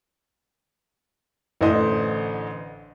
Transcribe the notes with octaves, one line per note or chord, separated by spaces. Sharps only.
A1 D3 C5 D#5